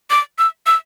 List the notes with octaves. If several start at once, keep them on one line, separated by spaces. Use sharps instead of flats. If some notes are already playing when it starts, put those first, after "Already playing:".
D6
E6
E6